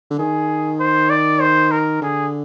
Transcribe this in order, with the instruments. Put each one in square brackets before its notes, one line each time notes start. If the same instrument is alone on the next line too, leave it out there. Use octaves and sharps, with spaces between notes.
[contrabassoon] D3
[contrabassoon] D#3 [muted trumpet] G#4
[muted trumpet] C5
D5
C5
A#4
[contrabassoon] D3 [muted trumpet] G#4